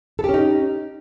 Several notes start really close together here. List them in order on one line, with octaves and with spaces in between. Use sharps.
A4 G4 C#4 D#4